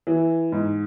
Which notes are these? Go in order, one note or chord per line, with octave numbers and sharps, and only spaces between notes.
E3
G#2